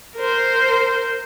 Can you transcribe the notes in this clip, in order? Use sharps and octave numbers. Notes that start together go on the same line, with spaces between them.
A#4 C5